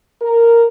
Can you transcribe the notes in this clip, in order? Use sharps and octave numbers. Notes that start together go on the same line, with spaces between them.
A#4